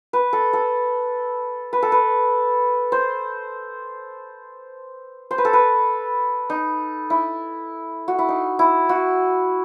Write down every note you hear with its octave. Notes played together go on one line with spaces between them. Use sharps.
B4
A4
A4
B4
A4
B4
C5
C5
B4
A4
B4
D#4
E4
F#4
E4
D#4
E4
F#4